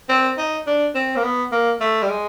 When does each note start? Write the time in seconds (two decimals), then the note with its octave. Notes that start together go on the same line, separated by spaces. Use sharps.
0.09 C4
0.38 D#4
0.67 D4
0.95 C4
1.16 A#3
1.23 B3
1.52 A#3
1.80 A3
2.03 G3
2.09 G#3